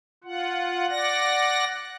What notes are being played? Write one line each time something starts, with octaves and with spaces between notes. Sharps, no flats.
F4 F#5
D5 F#5 A#6